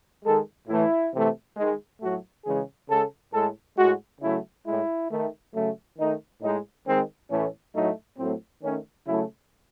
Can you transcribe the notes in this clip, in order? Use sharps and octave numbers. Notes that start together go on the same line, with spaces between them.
D#3 G#3 A4
A2 E3 A3 E4
C3 E3 A3
D#3 G#3
A2 F#3 A3 F#4
C#3 E3 G#3 G#4
C#3 G#3 A4
A2 G#3 A4
A2 G#3 F#4
C#3 F#3 A3 E4
A2 G#3 E4
D#3 A3
C#3 F#3 A3
D#3 A3 D#4
A2 G#3 D#4
D#3 G#3 C4
A2 E3 A3 C#4
A2 F#3 A3 D#4
A2 F#3 A3 C4
D#3 A3 C#4
C#3 F#3 A3 E4